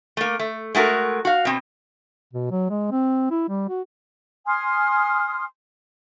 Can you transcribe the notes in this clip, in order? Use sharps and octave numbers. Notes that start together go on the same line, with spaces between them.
A3 A#3
A3
G#3 A3 F#4 A#4
F#4 F5
B2 C4
B2
F#3
G#3
C4
E4
G3
F#4
G#5 C6 D#6 F6